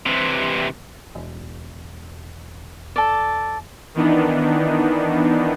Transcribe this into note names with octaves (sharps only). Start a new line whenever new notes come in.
C3 E3
E1
A4 D5
D#3 E3 B3 D4 D#4